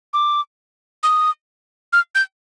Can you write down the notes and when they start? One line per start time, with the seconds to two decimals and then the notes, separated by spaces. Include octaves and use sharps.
0.13 D6
1.03 D#6
1.93 F6
2.15 G6